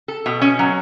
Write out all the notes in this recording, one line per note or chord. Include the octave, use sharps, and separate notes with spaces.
A4
B2
C#4
F#3